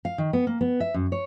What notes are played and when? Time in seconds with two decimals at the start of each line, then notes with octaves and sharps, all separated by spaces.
0.05 F5
0.18 D#3
0.33 B3
0.47 A#3
0.61 B3
0.80 E5
0.94 F#2
1.12 C#5